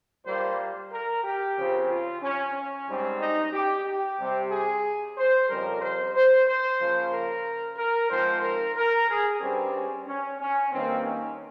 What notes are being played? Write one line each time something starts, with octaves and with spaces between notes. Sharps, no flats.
A#2 G3 A#3 C5
A#4
G4
C#3 F3 C4
F4
C#4
C#4
G#2 G3 C4
D#4
G4
G4
C3 G3 C4
G#4
C5
F2 C#3 G3 A#4
C5
C5
C5
C#3 F3 A#3
A#4
A#4
G#2 F3 C4 C5
A#4
A#4
G#4
G2 G3 C4 C#4
C#4
C#4
C#4
G2 D#3 A#3 C4
C#4